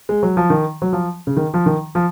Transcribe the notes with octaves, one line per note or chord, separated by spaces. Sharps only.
G#3
F#3
F3
D#3
F#3
F3
C#3
D#3
F3
D#3
F3